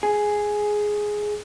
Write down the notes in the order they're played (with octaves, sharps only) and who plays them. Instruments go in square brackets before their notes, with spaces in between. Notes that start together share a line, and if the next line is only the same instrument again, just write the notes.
[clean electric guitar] G#4